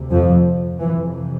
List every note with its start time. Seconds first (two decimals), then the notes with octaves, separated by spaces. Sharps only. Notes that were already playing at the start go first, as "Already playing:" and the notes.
Already playing: D2 C3
0.12 F2 F3
0.79 F2 C3 E3